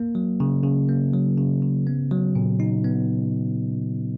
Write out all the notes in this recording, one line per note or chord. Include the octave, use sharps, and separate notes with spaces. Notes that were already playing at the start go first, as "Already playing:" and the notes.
Already playing: A#3
F#3
C#3
C#3
A#3
F#3
C#3
C#3
B3
F#3
A#2
D#4
B3